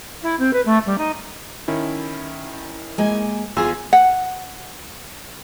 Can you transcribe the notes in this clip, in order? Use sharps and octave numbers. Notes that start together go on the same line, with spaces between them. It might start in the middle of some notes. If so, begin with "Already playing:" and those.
E4
C4
B4
A3
G3
D#4
D#3 C#4 E4
G#3 A#3 G#5
E2 F4 G#4 G#5 E6
F#5